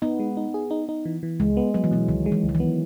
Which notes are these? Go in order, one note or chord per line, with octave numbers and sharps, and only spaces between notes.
B3 D#4
G#3
D#4
G#4
D#4
D#4
E3
E3
C#2 G#3
B3
F#3 B3
E3
B2 F#3
C#2 D#3
G#3
E3
C#2
D#3
E3
B3